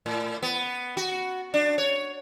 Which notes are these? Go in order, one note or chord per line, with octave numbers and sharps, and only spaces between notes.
A2
B3
F#4
D4
C#5